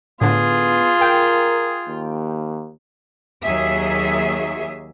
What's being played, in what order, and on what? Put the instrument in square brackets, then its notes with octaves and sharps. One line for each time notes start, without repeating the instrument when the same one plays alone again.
[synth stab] A2 D3 [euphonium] B3 [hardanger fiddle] F4 [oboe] G#4
[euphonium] A#4 [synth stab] G5
[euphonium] D#2
[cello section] D#2 F#3 G#4 E5